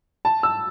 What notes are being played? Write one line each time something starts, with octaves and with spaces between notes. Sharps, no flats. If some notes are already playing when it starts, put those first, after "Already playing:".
A5
E6